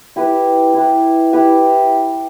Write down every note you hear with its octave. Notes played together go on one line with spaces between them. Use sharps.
E4 G4 B4
E4 G4 B4
E4 G4 B4